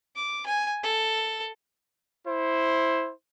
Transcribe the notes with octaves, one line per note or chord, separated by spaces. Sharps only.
D6
G#5
A4
E4 C5